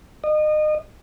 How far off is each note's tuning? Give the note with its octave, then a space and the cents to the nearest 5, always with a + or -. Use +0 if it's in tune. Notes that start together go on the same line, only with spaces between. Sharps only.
D#5 -30